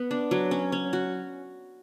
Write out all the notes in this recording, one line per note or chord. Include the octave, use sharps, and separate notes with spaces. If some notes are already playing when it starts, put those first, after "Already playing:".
Already playing: B3
D4
F#3
C#4
C#4
F#4